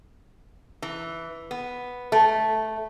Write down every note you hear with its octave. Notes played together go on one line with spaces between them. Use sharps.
E3
B3
A3